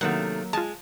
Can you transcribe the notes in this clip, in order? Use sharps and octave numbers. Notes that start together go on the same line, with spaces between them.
C3 D#3 F#3 A3 A#3 F#5
G#3 F4 A5